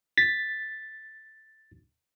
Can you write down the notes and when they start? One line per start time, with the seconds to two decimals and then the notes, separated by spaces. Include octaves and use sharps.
0.17 A6 B6